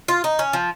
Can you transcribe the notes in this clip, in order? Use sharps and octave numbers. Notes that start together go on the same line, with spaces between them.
F4
D#4
C#4
F3